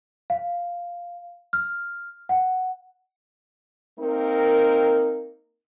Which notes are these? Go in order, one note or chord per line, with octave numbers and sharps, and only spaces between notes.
F5
F6
F#5
A#3 C4 D#4 A#4